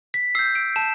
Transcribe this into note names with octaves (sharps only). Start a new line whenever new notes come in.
B6
E6 G6 C7
D7
A5 E7